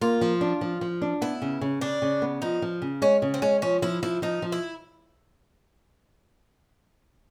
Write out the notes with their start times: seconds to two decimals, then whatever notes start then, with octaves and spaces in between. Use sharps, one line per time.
0.01 A#3 F4
0.21 F3
0.41 D4
0.61 F3
0.81 F3
1.02 D4
1.22 B3 E4
1.42 C#3
1.61 C#3
1.81 C#3 D4
2.02 C#3
2.22 B3
2.42 F3 D#4
2.62 F3
2.82 C#3
3.02 G#3 C#4
3.22 C#3
3.34 C4
3.42 G#3 C#4
3.62 F3 C#4
3.82 F3 E4
4.03 F3 E4
4.22 F3 D#4
4.42 F3
4.52 E4